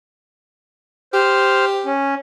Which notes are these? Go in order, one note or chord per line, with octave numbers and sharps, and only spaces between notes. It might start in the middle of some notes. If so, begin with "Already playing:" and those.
G4 C5 F6
C#4